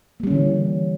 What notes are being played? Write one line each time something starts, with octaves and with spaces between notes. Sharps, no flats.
D3 E3 G3 A#3 C#4